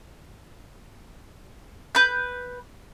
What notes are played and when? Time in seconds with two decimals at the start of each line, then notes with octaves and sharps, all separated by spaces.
1.95 B4 G6